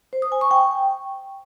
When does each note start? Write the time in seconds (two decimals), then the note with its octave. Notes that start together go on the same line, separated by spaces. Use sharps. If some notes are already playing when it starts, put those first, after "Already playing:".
0.13 C5
0.22 D#6
0.32 G#5
0.41 C#6
0.51 G5